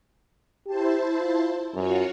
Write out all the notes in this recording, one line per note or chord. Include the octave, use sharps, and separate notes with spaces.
E4 G4 C5 A5
F4
F#2 F4 F#4 C#5